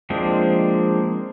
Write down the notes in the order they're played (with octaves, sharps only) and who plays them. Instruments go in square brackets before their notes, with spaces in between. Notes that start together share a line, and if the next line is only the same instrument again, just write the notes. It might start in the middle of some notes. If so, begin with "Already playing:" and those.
[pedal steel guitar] F3 G#3 A#3 C4 D4